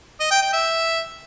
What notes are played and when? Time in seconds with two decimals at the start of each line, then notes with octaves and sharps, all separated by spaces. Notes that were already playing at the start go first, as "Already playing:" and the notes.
0.20 D#5
0.31 G5
0.42 G5
0.53 E5